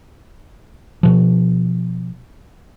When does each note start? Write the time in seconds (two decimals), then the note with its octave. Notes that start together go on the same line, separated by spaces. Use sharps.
1.03 B2 F3